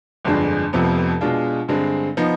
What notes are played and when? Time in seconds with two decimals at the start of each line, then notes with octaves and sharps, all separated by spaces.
0.25 G1 F2 D3 G#3 D4
0.73 F1 F2 C3 F3 B3
1.21 B2 G#3 D4 F4
1.68 G2 D3 G#3 C4
2.17 F3 B3 D#4